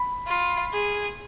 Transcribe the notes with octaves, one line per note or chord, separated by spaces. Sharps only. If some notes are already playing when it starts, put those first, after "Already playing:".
Already playing: B5
F4
G#4